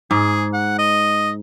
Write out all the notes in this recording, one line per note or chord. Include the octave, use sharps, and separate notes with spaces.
G#2 G#4
F#5
D#5